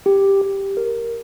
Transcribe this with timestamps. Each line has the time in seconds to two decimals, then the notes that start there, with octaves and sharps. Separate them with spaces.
0.06 G4
0.41 G4
0.77 A#4